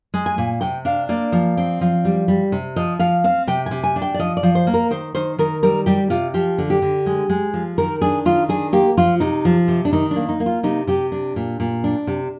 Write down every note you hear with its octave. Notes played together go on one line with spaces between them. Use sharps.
G#3
G#5
A#2
C3 G5
D4 F5
A#3 D5
F3
C4
F3
G3
G3
C3
F3 D#5
F3 F5
C4 F5
C3 G5
C3 G#5
G#5
D4
G5
D5
F3 D#5
D5
F3
C5
A#3
A#4
D#3 C5
D#3 C5
D#3 A#4
G3 A#4
G3 G4
C3 F4
F3 G4
D3
G4
D3
G#3
G#3
F3
D#3 A#4
D4 G#4
D#3 F4
D4 G#4
A#3 G4
F3 F4
C3 D#4
F3
C3
D4
D#3 D#4
A#3 D4
D#4
A#3
F4
C3 D#4
C3 G4
D4
A#2
A#2
D4
C3